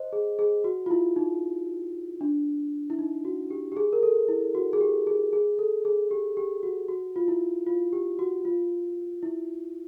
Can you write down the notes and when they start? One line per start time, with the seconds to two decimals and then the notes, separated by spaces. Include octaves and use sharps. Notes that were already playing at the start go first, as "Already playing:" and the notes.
Already playing: C5 D#5
0.13 G#4
0.39 G#4
0.64 F#4
0.86 F4
0.91 E4
1.16 D#4
2.21 D4
2.90 E4
2.99 D#4
3.25 F#4
3.51 G4
3.72 G4
3.77 G#4
3.93 A#4
4.03 A4
4.28 E4
4.55 F#4
4.73 G#4
4.81 G4
5.07 G#4
5.33 G#4
5.59 A4
5.85 G#4
6.11 G4
6.37 G4
6.63 F#4
6.88 F#4
7.16 F4
7.28 E4
7.67 F4
7.93 G4
8.19 F#4
8.45 F4
9.23 E4